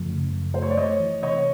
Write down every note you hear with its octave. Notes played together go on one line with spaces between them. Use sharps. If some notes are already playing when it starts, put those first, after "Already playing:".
Already playing: F#2 C#3 F3 A3
C#3
F#2
A3 C5
C#5
D5
A3 C#5 D#5
E3
C3 C#5 D#5